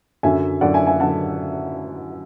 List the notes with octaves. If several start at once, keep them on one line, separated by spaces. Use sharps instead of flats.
F#2 D3 F#3 E5 G#5
F#2 D3 F#3 D5 F#5
E5 G#5
E5 G#5
D3 F#3 F#5 A5